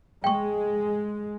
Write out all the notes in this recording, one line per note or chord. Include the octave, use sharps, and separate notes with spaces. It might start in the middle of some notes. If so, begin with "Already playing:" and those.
G#3 G5 C#6